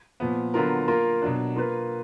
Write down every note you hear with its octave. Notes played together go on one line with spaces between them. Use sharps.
A#2 F3 B3
D3 F#3 B3 F4 A#4
A#3 F4 A#4
B2 F#3 D4
A#3 F4 B4